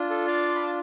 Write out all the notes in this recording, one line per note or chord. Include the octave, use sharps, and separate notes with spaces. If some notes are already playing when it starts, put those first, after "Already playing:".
Already playing: D4 F4
A4
D5 F5
C6
B5
A5